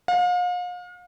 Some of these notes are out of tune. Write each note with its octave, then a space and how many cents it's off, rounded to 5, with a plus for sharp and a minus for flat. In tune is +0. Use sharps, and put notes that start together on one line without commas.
F5 +40